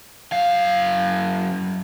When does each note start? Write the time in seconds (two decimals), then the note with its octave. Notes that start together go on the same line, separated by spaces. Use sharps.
0.32 F#2 F5